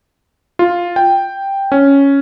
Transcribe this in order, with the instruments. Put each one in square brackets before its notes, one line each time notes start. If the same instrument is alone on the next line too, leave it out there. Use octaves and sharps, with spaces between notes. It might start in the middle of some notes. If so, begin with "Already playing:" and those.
[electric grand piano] F4
G5
C#4